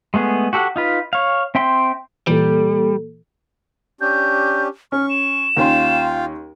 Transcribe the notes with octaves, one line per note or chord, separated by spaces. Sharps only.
G#3 A3 B3 G#4
F#4 G4 A4 F#5
D#4 F4 B4
C#5 F5
C4 E5 G5 C6
A#2 E3 G3 A#3 A4
C#4 D4 G4 G6
C#4 C#6 F6
E7
D#2 C#4 F4 F5 G5 C6